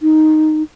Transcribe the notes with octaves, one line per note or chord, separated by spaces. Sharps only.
D#4